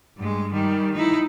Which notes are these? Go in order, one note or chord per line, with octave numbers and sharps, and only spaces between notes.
G2 G#3
D#3 G3
D#4 E4